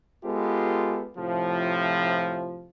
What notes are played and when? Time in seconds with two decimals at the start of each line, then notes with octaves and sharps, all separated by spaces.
0.24 G#3 B3 F4 G4 A4
1.18 A2 C3 F3